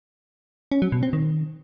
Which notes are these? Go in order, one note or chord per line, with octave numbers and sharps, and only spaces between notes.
C#4
F#3
B2
C4
D#3